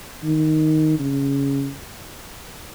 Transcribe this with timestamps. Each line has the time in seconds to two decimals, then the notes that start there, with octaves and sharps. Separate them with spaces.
0.24 D#3
0.99 C#3